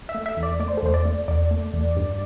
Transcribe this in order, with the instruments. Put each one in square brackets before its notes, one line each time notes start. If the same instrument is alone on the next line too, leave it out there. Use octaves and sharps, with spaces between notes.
[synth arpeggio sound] E5
A3
E5
E2
D5
A3 D5
C5
A4
E2 C5
D5
A3
E2 D5
A3
E2
G2